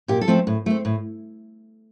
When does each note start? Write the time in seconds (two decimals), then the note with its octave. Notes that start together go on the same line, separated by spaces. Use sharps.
0.08 A#2 G4
0.21 A4
0.28 F3 A3 C4
0.47 A2
0.66 A3 C4
0.85 A2